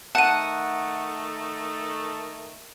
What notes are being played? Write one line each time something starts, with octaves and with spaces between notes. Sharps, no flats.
D#3 A3 F#5 A5 D#7